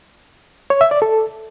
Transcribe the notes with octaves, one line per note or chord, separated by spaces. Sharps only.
C#5
E5
D5
A4